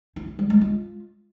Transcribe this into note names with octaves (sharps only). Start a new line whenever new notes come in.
E4
E4
G3
G#3
F4